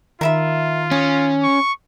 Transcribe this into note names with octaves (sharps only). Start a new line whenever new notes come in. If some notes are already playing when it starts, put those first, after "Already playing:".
D#3 F4 A#4 E5 B5
C#4 D#6
C#6